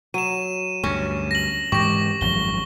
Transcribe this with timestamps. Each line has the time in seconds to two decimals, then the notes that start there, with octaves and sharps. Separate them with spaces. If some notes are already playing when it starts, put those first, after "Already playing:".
0.14 F#3 D#7 E7
0.84 D2 G2 C#4
1.31 A#6 F#7
1.72 G#2 E3 G#3 G4 C#6 A#6
2.21 G#1 F#2 F3 G7